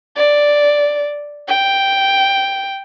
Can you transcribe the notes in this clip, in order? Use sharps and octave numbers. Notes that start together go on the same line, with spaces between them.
D5
G5